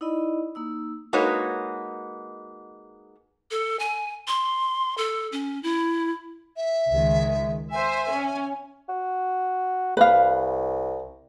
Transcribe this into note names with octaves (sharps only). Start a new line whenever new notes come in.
D#4 E4 D5 D#5 B5
A#3 D#4 E6
G#3 A#3 D#4 F#4 B4 C#5
A4
G#5
C6
A4
C#4
E4
E5
C#2 D#3 G#3
C5 E5 G#5
C#4
F#4
C2 B4 F5